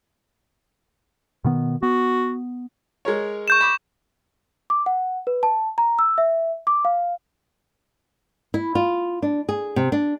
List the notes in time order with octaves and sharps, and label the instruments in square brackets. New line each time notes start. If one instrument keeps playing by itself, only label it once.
[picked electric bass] B2 D#3 B3
[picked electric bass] B3 [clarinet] F#4
[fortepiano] G#3 A#4 C#5
[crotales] C#6 G6 E7
[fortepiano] B5 D6
[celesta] D6
F#5
B4
A5
A#5
E6
E5
D6
F5
[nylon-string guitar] E4
F4
D4
G#4
C3
D4